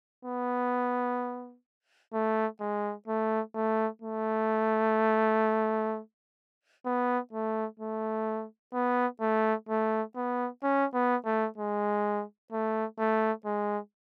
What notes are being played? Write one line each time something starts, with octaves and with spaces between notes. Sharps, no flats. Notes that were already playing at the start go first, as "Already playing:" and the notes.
B3
A3
G#3
A3
A3
A3
B3
A3
A3
B3
A3
A3
B3
C#4
B3
A3
G#3
A3
A3
G#3